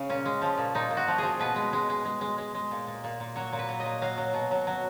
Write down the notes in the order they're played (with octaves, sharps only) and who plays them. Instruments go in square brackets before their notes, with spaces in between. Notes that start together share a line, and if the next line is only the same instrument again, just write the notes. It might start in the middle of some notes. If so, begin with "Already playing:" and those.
Already playing: [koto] C#3
A#2 C#4
G#3
F3
A#2
A#2 D#4
A#2
F#4
F3
F3 G#4
B2 B4
G#3
G#3
G#3
G#3
G#3
G#3
G#3
A#2
A#2
A#2
A#2
F#3 C#5
A#2
B4
F#3
D#5
A#2
F#3 F5
F#3
B2
F#3
F#3